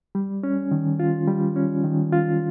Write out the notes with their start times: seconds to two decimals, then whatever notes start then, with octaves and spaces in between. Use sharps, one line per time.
0.15 G3
0.43 C#4
0.71 D#3
1.00 F4
1.28 G3
1.56 C#4
1.84 D#3
2.13 F4